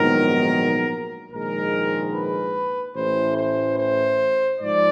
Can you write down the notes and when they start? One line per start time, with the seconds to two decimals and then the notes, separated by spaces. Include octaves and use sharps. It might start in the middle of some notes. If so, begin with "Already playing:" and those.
Already playing: A#1 G#2 D#3 F#3 B3 A#4
1.31 A#1 G#2 D#3 G#3 A#4
2.12 B4
2.95 A1 A2 E3 C5
3.37 C5
3.78 C5
4.60 G#2 F3 D5